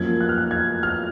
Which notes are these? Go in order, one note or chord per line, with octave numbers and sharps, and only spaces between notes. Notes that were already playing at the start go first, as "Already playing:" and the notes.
Already playing: F#2 F3 A#3 G#6
F#6
F6
F#6
G#6
F6